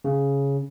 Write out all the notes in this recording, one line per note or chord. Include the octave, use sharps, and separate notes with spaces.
C#3